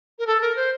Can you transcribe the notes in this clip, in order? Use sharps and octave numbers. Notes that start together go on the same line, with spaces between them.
A#4
A4
A#4
C5